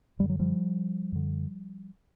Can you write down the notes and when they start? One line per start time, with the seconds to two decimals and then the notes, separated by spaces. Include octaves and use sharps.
0.19 F#2 D3 G3
0.29 F#3
0.39 F3 G3
1.12 F#2 D3